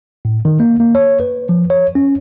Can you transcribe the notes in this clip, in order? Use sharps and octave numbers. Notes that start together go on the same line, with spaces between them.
A2
D#3
A#3
A#3
C#5
B4
F3
C#5
C#4